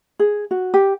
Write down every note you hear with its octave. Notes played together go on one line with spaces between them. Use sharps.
G#4
F#4
G4